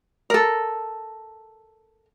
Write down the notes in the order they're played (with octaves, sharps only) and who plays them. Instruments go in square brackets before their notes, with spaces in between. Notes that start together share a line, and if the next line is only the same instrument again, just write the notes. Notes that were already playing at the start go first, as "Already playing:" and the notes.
[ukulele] A4 A#4